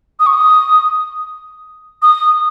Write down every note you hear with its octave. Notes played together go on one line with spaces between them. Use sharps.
D#6
C#6
D#6
D#6